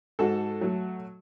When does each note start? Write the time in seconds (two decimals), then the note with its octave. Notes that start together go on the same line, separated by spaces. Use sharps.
0.19 G#2 F#4 A4
0.61 F#3 A3